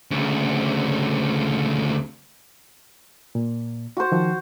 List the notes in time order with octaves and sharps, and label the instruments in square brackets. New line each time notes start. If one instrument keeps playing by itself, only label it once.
[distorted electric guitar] D2 C#3
[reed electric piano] A#2
[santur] F#4 C5
[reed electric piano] D#3 F3